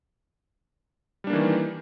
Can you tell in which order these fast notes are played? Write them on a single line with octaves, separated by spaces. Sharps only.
G3 D4 A#3 E3 D#3